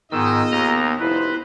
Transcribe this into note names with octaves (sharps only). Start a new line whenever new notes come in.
G#2 D#3 B3 F4 G#4 D#5 E6
D#2 A#5
F1 E4 B4 C5